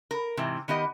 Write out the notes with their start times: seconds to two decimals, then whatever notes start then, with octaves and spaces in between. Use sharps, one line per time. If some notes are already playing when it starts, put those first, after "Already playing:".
0.11 A#4
0.37 G#2 C3 E3
0.68 D#3 B3 G4 D#5